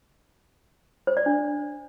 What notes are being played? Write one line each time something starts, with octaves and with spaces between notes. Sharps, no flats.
C5
D5
D4